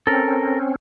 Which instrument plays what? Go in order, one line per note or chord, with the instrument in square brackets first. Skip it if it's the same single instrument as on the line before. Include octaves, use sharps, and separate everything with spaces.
[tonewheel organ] C4 C#4 [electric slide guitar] A4 A#4